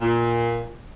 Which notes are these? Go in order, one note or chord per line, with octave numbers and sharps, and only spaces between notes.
A#2